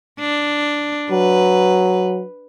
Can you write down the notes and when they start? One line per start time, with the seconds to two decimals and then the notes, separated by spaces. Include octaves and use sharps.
0.20 D4
1.11 F#3 B4